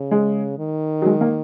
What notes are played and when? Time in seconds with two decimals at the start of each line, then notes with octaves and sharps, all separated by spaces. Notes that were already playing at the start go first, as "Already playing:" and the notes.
Already playing: C#3
0.11 G#3
0.58 D#3
1.02 F#3
1.06 G#3
1.21 A#3